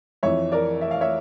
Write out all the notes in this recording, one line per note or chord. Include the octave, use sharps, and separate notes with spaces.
F2 E3 C#5 E5
A#4 D5
E5
F5
C#5 E5